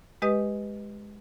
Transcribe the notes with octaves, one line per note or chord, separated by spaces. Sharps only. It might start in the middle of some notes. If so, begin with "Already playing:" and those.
G#3 G4 B4 D#5 D#6